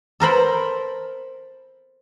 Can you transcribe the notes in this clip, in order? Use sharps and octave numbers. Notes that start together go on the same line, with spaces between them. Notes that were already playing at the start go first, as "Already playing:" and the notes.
A4 A#4 C5 B5